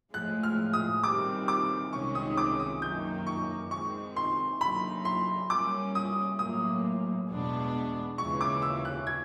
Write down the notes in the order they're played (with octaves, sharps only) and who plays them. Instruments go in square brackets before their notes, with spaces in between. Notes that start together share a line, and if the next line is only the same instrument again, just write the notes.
[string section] A2 F3 G#3 [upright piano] F#6
[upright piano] F6
D#6
[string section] D#3 G3 C4 [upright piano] D6
[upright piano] D6
[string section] C2 C3 D#3 G#3 C#4 [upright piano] C#6
[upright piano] D#6
D6
D#6
[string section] F#2 D#3 F#3 A#3 D#4 [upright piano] G6
[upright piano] C#6
[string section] D#3 G#3 C4 [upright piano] C#6
[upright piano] C6
[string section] D3 F#3 A#3 D#4 [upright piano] B5
[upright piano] C6
[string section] G3 A#3 C#4 [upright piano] D6
[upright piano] D#6
[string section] A2 F#3 A#3 [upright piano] D#6
[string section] E2 B2 G#3 B3 D4
[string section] D#2 C#3 E3 G#3 [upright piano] C#6
[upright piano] D6
E6
F#6
G#6